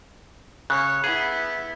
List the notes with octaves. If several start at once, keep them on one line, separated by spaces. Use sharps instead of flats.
C#3 C#5 F#6
B3 E4 G#4